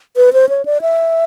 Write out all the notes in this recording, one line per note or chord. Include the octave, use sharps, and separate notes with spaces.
B4
C5
C#5
D5
E5